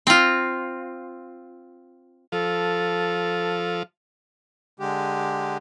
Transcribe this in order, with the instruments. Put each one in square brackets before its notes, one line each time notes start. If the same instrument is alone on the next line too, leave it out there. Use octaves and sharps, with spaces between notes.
[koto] C4 F4
[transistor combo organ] F3 [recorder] A4
[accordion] D3 G#3 G4